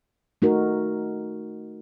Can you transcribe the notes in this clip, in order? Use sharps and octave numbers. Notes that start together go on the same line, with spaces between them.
A3 D#4 F#4 A#4